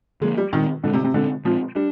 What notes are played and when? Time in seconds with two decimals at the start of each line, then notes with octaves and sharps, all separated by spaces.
0.21 D3 F3 G#3 A#3
0.37 G3
0.53 A#2 D#3 G#3 C4
0.84 A#2 D3 G#3 C4
0.93 C3
1.04 C3
1.14 A#2 D3 G#3 C4
1.45 A#2 F3 G#3 C4
1.76 G3 D4